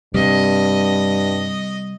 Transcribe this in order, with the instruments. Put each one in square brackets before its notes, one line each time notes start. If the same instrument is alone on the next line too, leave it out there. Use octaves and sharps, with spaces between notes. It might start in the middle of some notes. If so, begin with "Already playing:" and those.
[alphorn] G2 [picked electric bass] C3 G3 [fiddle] D#5